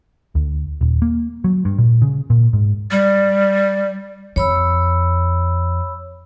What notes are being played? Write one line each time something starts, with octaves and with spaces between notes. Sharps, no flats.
D2
D#1
A#3
F#3
G2
A#2
C#3
A#2
G#2
G3
F2 C#5 B5 E6